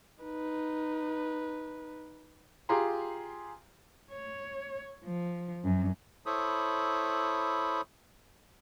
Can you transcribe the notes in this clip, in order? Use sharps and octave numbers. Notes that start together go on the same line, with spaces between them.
D#4 B4
F4 G4 G#4 A#5 C6
C#5
F3
F#2
E4 A4 C5 C#5 B5 D#6